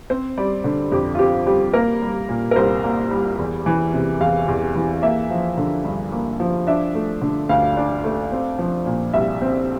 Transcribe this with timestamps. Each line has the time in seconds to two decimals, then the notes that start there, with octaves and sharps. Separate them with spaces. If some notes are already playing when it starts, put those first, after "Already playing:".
0.10 C4 C5
0.37 G3 D5
0.64 D3
0.92 F2 G4
1.15 F4
1.19 C4 G4
1.46 G3 G4
1.74 A#3 A#4
2.02 G3
2.29 A#2
2.51 A#4
2.56 C2 C5
2.84 A#3
3.11 G3
3.39 E2
3.66 E3
3.93 C3
4.20 E2 F5
4.48 E2
4.75 E3
5.02 A#3 E5
5.30 F3
5.58 D3
5.85 G2
6.12 A#3
6.40 F3
6.67 D4 E5
6.95 A3
7.22 D3
7.49 D2 F5
7.77 D4
8.04 A3
8.32 C4
8.59 F3
8.86 A#2
9.13 C2 E5
9.41 C4